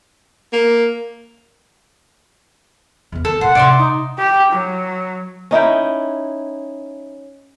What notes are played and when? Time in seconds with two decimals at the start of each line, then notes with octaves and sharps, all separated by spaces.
0.53 A#3
3.12 E2 B3
3.25 D#3 A4
3.41 A2 C5 F#5
3.55 C3 D4 D5 E5 C6
3.78 D#4
4.18 G4
4.53 F#3
5.51 C#4 D#4 E4 G5